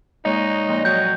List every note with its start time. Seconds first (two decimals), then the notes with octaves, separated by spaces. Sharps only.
0.25 A#2 G#3 D#4 C#5 D#5
0.68 F2 A#2 A#3
0.85 F#3 G6